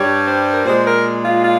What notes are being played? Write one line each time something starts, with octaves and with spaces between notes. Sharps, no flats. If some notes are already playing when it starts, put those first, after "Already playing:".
Already playing: G2 G3 C#5
C5
A#4
A#2 G#3 C5
A#4
F4
F4